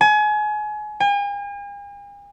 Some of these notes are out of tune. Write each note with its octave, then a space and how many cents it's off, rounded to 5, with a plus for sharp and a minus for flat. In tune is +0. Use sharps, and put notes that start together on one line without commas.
G#5 +30
G#5 -45